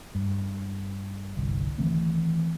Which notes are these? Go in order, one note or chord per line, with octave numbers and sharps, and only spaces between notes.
G2
G1 C2
D#3 E3 A3 C4